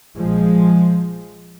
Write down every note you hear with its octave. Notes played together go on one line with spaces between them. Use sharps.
A#1 A#2 F3 G#3